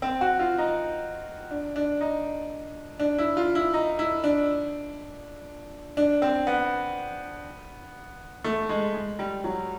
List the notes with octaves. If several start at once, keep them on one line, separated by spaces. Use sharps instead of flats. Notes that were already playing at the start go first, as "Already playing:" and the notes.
C4
F#4
F4
D#4
D4
D4
D#4
D4
E4
F4
E4
D#4
E4
D4
D4
C4
B3
A3
G#3
G#3
G3
F#3